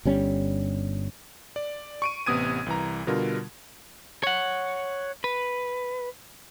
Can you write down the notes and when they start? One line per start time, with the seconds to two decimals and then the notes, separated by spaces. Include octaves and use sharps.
0.05 G1 G3 C#4
1.56 D5
2.02 C#6 D7 D#7
2.26 A1 C3 B3 D#6 G#6 D#7
2.66 C2 E3 A#5
3.07 B2 D3 G3 F4 A#4
4.23 C#5 F#5
5.24 B4